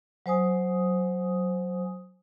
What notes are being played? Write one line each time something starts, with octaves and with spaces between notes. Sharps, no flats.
F#3 C5 G#5 D#6